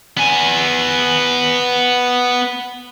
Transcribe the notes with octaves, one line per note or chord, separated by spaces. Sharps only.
B3 G#5